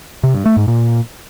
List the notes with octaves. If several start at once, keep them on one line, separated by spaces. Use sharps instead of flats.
C3
G2
A3
G#2
A#2